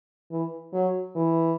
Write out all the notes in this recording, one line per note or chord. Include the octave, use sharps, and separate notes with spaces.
E3
F#3
E3